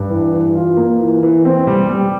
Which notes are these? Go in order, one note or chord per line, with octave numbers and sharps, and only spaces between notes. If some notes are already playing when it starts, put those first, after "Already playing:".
Already playing: G2
E3
E3
F4
A#3
E3
E3
C4
G3
G3